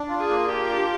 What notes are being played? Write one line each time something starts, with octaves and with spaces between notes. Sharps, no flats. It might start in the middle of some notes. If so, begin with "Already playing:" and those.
Already playing: D4
F4
G#4
A#3
F4 G4
D4